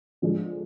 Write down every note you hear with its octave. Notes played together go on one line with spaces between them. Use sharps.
D3 F3 G#3 D4